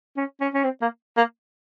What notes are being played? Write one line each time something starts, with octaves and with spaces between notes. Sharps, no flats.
C#4
C#4
C#4
C4
A#3
A#3